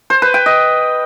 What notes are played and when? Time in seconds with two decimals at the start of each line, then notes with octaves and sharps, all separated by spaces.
0.10 C5
0.22 B4
0.34 G5
0.46 D#5